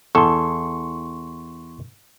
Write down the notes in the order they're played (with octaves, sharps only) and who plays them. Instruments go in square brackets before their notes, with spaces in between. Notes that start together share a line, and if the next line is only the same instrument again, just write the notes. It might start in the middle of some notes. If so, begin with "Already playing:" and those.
[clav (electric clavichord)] E2 A4 [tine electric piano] C6 C#6